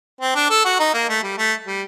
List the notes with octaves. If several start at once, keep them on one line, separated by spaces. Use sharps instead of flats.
C4
D4
A4
F#4
D#4
A#3
A3
G3
A3
G3